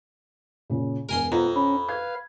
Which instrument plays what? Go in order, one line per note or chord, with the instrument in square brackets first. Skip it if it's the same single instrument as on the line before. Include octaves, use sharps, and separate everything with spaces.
[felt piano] A#2 C#3
[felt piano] E1 B2 [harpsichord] A#4 G#5 C6
[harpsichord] F2 [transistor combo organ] B3 [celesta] F4 [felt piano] A#5
[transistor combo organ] C#4 [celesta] B5
[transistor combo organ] B4 F5 [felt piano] G#6